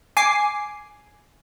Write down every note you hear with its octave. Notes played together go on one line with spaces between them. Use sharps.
G#5 D6 C7